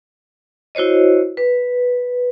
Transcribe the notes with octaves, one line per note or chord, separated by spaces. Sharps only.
E4 F#4 C5 C#5 D#5
B4